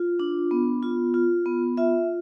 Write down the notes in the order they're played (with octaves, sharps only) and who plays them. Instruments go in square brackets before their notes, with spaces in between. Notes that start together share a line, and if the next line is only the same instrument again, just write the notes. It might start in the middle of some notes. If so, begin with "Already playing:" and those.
Already playing: [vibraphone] F4
D4
B3
F4
F4
B3
F4 E5